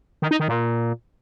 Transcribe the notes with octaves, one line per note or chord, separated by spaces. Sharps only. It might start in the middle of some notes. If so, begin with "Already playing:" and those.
D#3
D#4
D#3
A#2